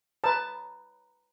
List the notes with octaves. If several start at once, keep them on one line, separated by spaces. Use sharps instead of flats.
B4 C#5 A5 A#5 D#6